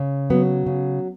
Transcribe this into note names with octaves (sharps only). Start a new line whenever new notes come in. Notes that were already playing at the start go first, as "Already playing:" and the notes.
Already playing: C#3
F#3 B3
C#3